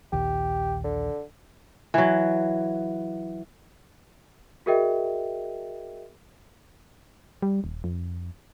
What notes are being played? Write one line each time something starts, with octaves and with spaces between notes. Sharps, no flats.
A#1 D#2 G4
D3
E3 F#3
F#4 G#4 A#4 D#5 E5 G5
G3
D#1
F2